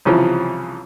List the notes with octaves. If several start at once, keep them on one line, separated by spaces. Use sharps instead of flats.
C2 C#3 E3 F3